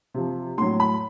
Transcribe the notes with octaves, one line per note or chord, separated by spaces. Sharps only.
C3 F3
A2 F#3 C6
B5